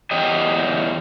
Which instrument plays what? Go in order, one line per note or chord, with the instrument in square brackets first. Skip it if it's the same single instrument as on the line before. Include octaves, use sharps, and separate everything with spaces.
[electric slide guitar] E2 C#4 G4 D#5